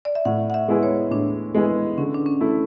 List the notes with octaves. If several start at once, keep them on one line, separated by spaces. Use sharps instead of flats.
D5
E5
A2 F#5
F#5
E5
G#3 B3 E4 G#4
C#5
A2 D4
G#3 B3 E4 G#4
D3 C#4
D4
C#4
A3 E4 A4